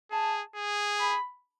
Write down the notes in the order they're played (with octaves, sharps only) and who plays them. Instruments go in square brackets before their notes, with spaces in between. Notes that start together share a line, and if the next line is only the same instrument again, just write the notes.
[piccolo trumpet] G#4 [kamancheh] A5
[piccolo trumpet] G#4
[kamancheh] B5